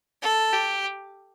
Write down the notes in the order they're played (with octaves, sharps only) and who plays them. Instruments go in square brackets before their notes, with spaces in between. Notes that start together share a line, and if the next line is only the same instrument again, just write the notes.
[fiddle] A4
G4